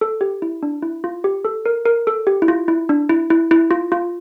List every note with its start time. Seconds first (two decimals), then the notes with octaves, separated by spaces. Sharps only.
0.01 A4
0.21 G4
0.42 E4
0.63 D4
0.82 E4
1.04 F4
1.24 G4
1.45 A4
1.66 A#4
1.86 A#4
2.07 A4
2.27 G4
2.42 E4
2.48 F4
2.68 E4
2.89 D4
3.09 E4
3.30 E4
3.51 E4
3.71 F4
3.92 F4